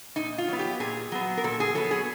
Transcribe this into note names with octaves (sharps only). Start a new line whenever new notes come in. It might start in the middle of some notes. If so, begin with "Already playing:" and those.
A#2 D#4
F4
F#3 B3
G4
A#2 G#4
F#3 B3
A#4
A#2 A4
G#4
F#3 B3 A4
G#4